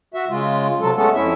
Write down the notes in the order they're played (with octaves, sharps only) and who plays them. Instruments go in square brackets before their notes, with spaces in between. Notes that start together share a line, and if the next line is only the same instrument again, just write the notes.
[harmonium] F#4 E5
C#3 G#3 F4
C3 F#3 A4
G#3 A3 B3 C#4 A4
F2 C#4 E4 E5